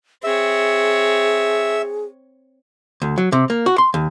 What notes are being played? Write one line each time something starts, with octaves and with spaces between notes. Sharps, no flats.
C4 G#4 C#5 E5
D2
F#3
C3
A#3
F#4
C6
D#2